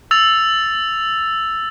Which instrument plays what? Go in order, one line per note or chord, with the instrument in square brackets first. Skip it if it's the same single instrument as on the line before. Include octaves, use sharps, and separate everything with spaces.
[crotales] E6 A6 F7